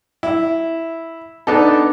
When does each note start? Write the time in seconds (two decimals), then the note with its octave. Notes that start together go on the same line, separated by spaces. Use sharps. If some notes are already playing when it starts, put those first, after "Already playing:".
0.23 E4
1.47 B3 D4 D#4 A4